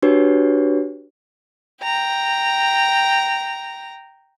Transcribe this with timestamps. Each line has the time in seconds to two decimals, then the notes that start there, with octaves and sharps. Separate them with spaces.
0.02 D4 F#4 G4 B4 C#5
1.82 G5 A#5